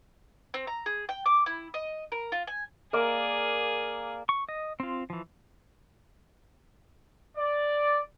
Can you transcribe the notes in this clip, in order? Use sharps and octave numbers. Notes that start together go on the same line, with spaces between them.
C4
A#5
G#4
G5
D6
E4
D#5
A#4
F4
G#5
A#3 G#4 D5
C#6
D#5
C4 F4
E3 F3
D5